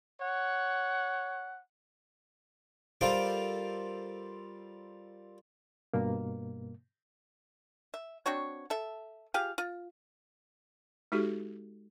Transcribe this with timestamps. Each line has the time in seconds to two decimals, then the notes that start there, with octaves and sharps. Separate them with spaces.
0.20 C#5 F#5
3.01 G3 F4 A4 A#4 C5 D6
5.94 G2 B2 A#3
7.94 E5
8.26 C4 D4 F#4 C#5
8.70 A4 E5
9.34 F4 G4 G#4 F5
9.58 F4
11.12 G#3 D#4 F#4 G4 A4